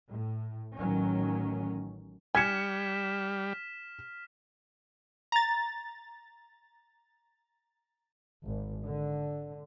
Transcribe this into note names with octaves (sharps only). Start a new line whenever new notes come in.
A2
A1 D#3 F#3 C#4
G3 G#5 F6 G#6 B6 C#7 E7
A#5 A6
G#1
D3